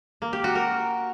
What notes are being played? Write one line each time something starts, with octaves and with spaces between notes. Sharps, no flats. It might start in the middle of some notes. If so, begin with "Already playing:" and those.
A#3
G4
F#4
A#4